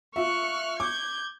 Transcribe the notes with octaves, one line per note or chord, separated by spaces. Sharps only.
F4 E5 C#6 F6 F#6
D6 G6 G#6